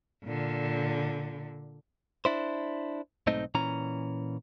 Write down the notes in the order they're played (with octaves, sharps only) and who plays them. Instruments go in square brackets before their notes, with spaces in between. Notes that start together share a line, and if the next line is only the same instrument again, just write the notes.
[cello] A#2 D3
[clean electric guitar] D4 E4 C5
B1 G#2 A3 C4 D#4 D#5
A#2 E3 C#4 A#5